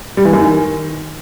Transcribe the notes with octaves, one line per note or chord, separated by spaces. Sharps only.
G3
E3
F#2
D#3